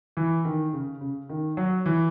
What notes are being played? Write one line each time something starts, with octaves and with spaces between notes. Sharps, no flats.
E3
D#3
C#3
C#3
D#3
F#3
E3